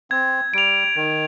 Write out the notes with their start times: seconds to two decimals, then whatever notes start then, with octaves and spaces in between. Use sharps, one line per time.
0.11 C4 G#6
0.54 G3 D7 F7
0.96 D#3 G#6